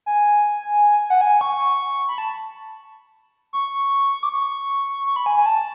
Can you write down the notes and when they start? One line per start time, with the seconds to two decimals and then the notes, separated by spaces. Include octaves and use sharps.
0.06 G#5
1.10 F#5
1.21 G#5
1.41 C#6
2.09 B5
2.18 A5
3.53 C#6
4.23 D6
4.29 C#6
5.06 C#6
5.16 B5
5.26 G#5
5.36 G#5
5.46 A5